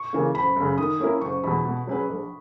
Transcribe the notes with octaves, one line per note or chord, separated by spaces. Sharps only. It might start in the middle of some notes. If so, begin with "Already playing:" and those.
Already playing: C#6
C#3 E3 A#3
F#1 B5
F#2 C#3
D#3 D#6
A#3 C#4 E4 A#4
F#1 C#6
E2 B2 B5
B2
F#3 C#4 G#4 B4
A#1